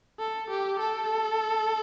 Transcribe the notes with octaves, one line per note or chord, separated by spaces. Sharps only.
A4
G4
A4